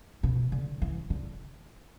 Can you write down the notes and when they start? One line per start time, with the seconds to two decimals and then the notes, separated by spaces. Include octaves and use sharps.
0.23 B2
0.52 D3
0.82 E3
1.10 D3